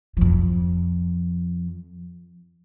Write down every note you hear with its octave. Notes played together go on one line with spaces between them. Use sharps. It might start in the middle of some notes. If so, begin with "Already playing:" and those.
F2 F3